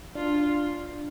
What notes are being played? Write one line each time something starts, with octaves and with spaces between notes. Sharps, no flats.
D4 F4